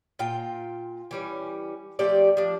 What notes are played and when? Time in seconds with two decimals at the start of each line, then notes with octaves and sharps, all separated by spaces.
0.19 A#2 F4 G5
1.11 E3 G3 C#4
1.99 F3 A3 G4 D5
2.37 F3 D4